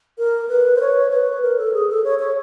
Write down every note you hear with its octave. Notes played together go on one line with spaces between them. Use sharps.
A#4
B4
C5
C#5
B4
A#4
A4
G#4
A4
C#5
C#5